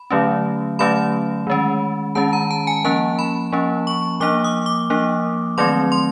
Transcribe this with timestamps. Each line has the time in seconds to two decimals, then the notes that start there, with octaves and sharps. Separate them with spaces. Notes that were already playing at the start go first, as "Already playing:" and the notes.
Already playing: B5
0.10 D3 F#3 A3 C#4
0.79 D3 F#3 A3 C#4 B5
1.47 D#3 G#3 C#4
2.15 D#3 G#3 C#4 A5
2.33 A#5
2.51 A5
2.67 G#5
2.84 F3 A#3 C#4 A5
3.19 B5
3.52 F3 A#3 C#4
3.87 C#6
4.20 F3 A#3 D4 D6
4.44 D#6
4.66 D6
4.90 F3 A#3 D4
5.58 D#3 F#3 A3 C4 C6
5.92 C6